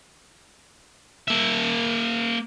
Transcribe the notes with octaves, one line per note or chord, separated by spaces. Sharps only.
A#3 E5